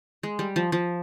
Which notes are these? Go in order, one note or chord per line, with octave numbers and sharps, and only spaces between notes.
G#3
G3
F3
F3